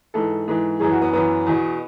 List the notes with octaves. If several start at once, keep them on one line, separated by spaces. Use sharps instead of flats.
G#2 E3 A4
G#2 E3
F#2 E3 G#4
F#4
B3
F#2 E3 B3
E2 B2